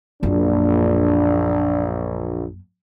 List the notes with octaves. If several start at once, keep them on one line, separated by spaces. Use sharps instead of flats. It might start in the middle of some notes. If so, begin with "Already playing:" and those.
A#1 F#2 A#3 D4